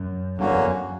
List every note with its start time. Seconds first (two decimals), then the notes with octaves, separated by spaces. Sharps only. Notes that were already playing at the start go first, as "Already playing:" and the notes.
Already playing: F#2
0.38 E2 G2 D3 A#3 C#4 F#4
0.52 F#2
0.64 F#2